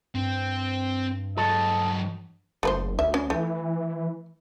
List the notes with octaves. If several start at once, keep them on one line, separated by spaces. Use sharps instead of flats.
G2 C4
F#3 G#3 A4 D#5
F#1 A3 B4 C5
D2 E5
C#4
E3 A3